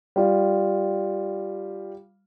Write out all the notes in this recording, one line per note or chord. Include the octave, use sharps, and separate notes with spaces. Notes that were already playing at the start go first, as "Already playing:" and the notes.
G3 F4